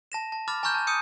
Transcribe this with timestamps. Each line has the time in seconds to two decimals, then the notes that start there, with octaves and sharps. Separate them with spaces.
0.12 A5 A#6 E7
0.32 A5
0.48 B5 D6 F6 A6
0.63 G#5 A#5 C#6 F6 G6 E7
0.75 A5 F6
0.87 D#6 E6 G6 C#7 D#7